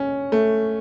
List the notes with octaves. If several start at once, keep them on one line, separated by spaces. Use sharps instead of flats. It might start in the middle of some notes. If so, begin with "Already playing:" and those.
Already playing: C#4
A3